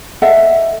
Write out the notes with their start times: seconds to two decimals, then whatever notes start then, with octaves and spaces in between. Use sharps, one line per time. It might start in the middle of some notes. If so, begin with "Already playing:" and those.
0.22 A4 D#5 E5 F#5